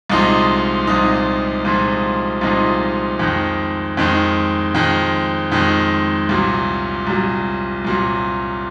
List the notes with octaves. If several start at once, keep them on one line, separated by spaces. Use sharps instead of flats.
C2 A#2 F3 G#3 D#4
C2 A#2 F3 G#3 D#4
C2 A#2 F3 G#3 D#4
C2 A#2 F3 G#3 D#4
F2 D#3 G#3
F2 D#3 G#3
F2 D#3 G#3
F2 D#3 G#3
C2 A#2 F#3
C2 A#2 F#3
C2 A#2 F#3